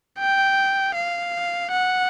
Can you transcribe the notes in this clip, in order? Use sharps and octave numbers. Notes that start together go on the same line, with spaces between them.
G5
F5
F#5